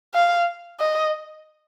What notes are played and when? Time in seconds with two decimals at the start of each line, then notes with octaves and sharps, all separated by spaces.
0.14 F5
0.80 D#5